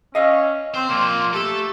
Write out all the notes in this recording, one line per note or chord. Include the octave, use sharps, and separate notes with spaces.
C#4 D#5 F5
C4 C5 C6
A#2 F3 A#3
A3 G4 A4